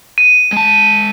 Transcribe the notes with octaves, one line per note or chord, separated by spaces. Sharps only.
D#7
G#3 A5